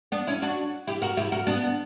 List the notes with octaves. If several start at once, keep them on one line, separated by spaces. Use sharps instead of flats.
B3 D4
C#4 E4
D4 F#4
E4 G4
F#4 A#4
E4 G4
F#4 A#4
B3 D4